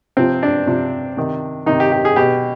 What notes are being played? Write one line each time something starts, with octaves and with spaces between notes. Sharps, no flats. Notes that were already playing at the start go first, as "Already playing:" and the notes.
C3 F3 C4
D4
C3 F3
C3 D#3
C3 D#3 D#4
G4
G4
G#4
B2 G4